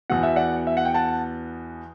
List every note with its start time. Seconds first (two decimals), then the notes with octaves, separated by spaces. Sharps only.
0.10 E2 B2 F#5
0.23 E5
0.36 D5 F#5
0.67 E5
0.77 F#5
0.85 G5
0.94 F#5 A5